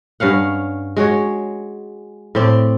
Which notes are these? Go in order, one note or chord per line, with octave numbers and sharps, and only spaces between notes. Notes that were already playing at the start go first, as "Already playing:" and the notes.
G2 C#4 F5 F#5
G#3 F#4 C#5
A2 C4 D5